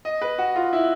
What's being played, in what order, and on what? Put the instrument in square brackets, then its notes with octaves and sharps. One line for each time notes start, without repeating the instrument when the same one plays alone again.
[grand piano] D#5
B4
F#4
F4
E4